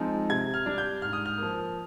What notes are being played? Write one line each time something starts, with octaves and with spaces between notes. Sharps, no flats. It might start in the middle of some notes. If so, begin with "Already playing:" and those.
Already playing: F3 G#3 C4 D#4
C3 G#6
F6
G3 D4
G6
G#2 F6
D#6
F6
F3 A#3